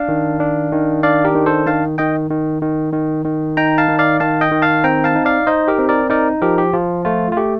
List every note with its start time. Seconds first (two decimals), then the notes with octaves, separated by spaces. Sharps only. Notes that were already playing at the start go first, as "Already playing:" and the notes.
Already playing: D4 F5 A5
0.08 D#3
0.40 D4
0.72 D#3
1.03 D4 D5 F5
1.25 G4 A#4
1.35 D#3
1.46 A4 C5
1.67 D#3 F5 A5
1.98 D#3 D#5 G5
2.30 D#3
2.62 D#3
2.93 D#3
3.25 D#3
3.57 D#4 G5 A#5
3.78 F5 A5
3.89 D#3
3.99 D5 F5
4.20 D#3 F5 A5
4.41 D#5 G5
4.51 D#3
4.62 F5 A5
4.84 C4 G5 A#5
5.04 F5 A5
5.15 D#4
5.25 D5 F5
5.47 D#4 C5 D#5
5.68 G4 A#4
5.79 C4
5.89 A#4 D5
6.10 D#4 A#4 D5
6.42 F3 G4 A#4
6.58 G4
6.73 F3 F4
7.05 A3 F4
7.32 F4
7.37 A3 G4